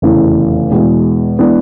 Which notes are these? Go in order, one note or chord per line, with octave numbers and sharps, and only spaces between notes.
F1 E2 C#3 E3
E2 B2 G#3
E3 G#3 B3 D4